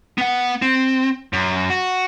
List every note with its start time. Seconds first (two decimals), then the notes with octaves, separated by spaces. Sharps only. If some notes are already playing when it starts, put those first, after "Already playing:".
0.18 B3 F#5
0.62 C4
1.33 F#2
1.70 F#4